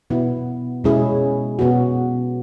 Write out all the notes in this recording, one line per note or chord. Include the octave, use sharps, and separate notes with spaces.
B2 B3 E4
B2 G#3 C#4 E4 G#4
B2 B3 F#4